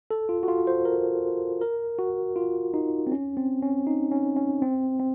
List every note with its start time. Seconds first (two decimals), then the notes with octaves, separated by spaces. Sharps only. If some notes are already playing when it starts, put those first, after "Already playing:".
0.11 A4
0.29 F4
0.43 F#4
0.48 F4
0.67 C5
0.85 A#4
1.61 A#4
1.99 F#4
2.36 F4
2.74 D#4
3.07 C4
3.12 C#4
3.37 C4
3.62 C#4
3.87 D#4
4.11 C#4
4.36 C#4
4.62 C4
5.00 C4